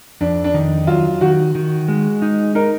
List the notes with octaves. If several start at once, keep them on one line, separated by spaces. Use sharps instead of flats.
F2 D4
D4
D#3 D#4
F#3 F4
D#3 F#4
D#3
G#3
D#4
D#4 A#4